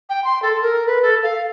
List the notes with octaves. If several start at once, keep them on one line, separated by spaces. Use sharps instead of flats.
G5
C6
A4
A#4
B4
A4
F5